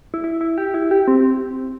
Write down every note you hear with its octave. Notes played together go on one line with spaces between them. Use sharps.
E4
E4
E4
G4
E4
G4
C4